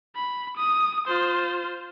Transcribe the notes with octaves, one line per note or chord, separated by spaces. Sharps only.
B5
D#6
F4 C5